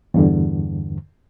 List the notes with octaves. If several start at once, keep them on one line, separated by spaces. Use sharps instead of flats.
E2 G2 D3